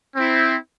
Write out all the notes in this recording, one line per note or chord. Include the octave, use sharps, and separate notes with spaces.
C4 E4